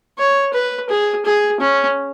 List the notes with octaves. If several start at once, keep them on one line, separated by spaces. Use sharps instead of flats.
C#5
B4
G#4
G#4
C#4